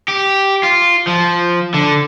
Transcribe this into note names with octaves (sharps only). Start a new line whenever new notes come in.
G4
F4
F3
D3